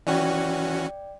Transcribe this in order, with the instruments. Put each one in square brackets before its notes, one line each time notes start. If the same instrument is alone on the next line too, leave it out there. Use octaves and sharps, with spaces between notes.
[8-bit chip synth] E3 C#4 F#4 [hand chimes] D5 G5